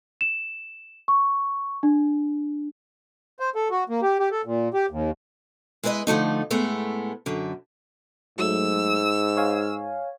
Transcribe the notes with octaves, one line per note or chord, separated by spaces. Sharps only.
E7
C#6
D4
C5
A4
F#4
A#3
G4
G4
A4
A#2
G4
D#2
G#3 E4 B4 D5 D#5
D3 F3 A3 D#4
A2 G#3 A3 B3
F#2 D3
G#2 F#3 A3 E6
C#5 F5 G#5